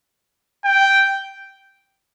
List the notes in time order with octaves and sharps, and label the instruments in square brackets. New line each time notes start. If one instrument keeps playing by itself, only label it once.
[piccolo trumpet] G5